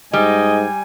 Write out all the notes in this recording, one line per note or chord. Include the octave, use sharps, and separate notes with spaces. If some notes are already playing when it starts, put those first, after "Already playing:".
G#2 G3 D#5 G#5